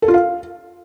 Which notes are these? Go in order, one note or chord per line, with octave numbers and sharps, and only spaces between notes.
A4
F4
F5